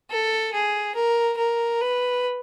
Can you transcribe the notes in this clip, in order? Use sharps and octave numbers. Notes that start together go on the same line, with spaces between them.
A4
G#4
A#4
A#4
B4